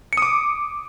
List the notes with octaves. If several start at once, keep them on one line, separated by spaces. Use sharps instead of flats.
D6 D#6 C#7